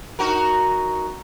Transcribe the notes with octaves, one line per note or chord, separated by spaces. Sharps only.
D#4 F#4 A#4